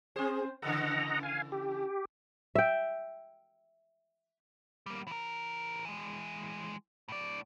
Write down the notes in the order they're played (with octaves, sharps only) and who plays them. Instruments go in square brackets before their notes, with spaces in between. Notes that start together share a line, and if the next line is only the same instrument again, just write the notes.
[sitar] C4 C5 [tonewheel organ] G#4
[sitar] C#3 E3 A4 [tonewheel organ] D#5 F#5 A#5
[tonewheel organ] F5 G#5
G4
[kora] E5 G5
[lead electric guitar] G3 A#3
E3 A#4
E3 G#3
A2 D5